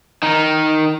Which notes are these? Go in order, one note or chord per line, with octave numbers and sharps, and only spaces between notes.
D#3 D#4